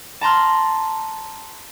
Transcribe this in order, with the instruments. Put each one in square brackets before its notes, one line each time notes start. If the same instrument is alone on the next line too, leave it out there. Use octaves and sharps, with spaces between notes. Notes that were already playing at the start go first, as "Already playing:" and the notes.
[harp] A5 A#5 C6 F6